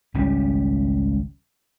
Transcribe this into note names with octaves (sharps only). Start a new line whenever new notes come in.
G#1 C#2 G3 C#4